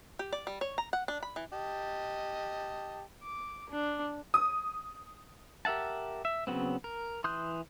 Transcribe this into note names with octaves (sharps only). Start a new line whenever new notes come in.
G4
D5
G3
C#5
A#5
F#5
D4
B5
E3
G4 D#5 A5
D6
D4
D#6
G4 A#4 E5 F#5 A5
E5
C#3 F3 F#3 B3 C4
A#4
E3 C6 D#6 F#6 G6